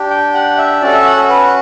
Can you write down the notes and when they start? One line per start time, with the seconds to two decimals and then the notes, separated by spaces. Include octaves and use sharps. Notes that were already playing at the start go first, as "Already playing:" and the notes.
Already playing: D4 G4
0.10 G5
0.34 F#5
0.57 E5
0.81 C#4 F#4 A4 D5
0.93 E5
1.05 F#5
1.16 A4
1.29 B4